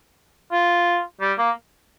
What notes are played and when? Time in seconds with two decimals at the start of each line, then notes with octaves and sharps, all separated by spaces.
0.52 F4
1.21 G3
1.38 A#3